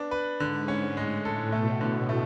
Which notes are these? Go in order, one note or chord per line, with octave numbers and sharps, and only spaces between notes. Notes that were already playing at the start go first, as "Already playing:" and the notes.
Already playing: B3 D4
B4
G#2 D3
C#4
A2 G#3
A2 A4
B2 A3
B2 D3
A3